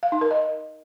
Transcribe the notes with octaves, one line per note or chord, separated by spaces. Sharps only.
F5
D#4
A#4
D#5